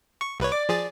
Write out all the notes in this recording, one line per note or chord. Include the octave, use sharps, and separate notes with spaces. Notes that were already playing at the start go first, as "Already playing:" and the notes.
C#6
C2 B4 C#5
D5 D6
F3 G#4 A6